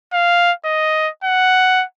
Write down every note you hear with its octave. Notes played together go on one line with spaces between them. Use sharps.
F5
D#5
F#5